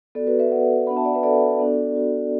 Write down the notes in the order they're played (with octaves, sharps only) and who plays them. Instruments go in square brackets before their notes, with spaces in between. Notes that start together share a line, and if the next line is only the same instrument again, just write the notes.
[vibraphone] B3 F#4 A4 D5
F#4 B4
B4 E5
D5 F#5
B3 D4 F#4 F#5 B5
E5 A5
D5 F#5
B4 E5
A4 D5
B3 D4 F#4
F#4